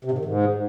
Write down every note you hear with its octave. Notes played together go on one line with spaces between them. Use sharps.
C3
G#2
D#3
G#2